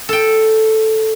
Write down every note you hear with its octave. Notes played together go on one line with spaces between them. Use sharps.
A4 G5